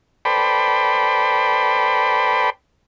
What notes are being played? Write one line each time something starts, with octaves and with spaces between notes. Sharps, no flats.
A4 B4 C5 D5 G5 B5